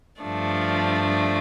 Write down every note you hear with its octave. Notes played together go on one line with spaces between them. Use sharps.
G2 F3 A3 D4